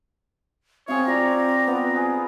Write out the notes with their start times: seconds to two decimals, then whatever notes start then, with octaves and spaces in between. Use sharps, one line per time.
0.88 C4 G#4 C#5 F5
1.07 F4 G4 D5 A#5
1.67 B3 F4 B4
1.96 G#4